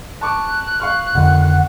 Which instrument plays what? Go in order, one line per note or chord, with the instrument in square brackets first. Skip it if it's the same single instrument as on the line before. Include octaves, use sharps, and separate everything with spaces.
[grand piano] A5 C#6 D6 [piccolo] F#6
[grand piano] F5 C#6 F6
[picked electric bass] F2 D3 D#3 [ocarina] F#5